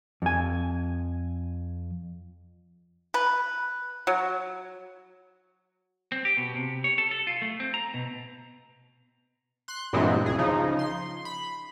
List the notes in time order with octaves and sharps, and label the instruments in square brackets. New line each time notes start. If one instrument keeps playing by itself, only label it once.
[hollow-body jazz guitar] F2 G#5
[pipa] B4
F#3
[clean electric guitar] C4
G4
B2
C3
C#5
A4
A4
F4
A3
C4
A#5
B2
[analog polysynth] C6 F#6
G2 A#2 E3 G#3 B3 C4
C#2 G#4
C#3 F3 D#4
C6
B5